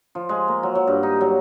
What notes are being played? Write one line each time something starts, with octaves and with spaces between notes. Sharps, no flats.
F3
G#3
A#3
F#3
F#3
G2
D#4
F#3